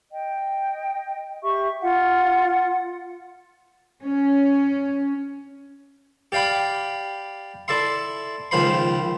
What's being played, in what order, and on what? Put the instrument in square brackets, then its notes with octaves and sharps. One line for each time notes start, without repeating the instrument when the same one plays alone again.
[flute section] D#5 G5
G4 E5 C#6
F4 F#5
[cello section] C#4
[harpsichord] G4 D5 F5 G5 B5
E4 A4 D5 E5 C6
C#2 D#3 F3 C5 B5 C6